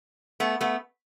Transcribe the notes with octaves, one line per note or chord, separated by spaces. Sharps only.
A3 B3
A3 B3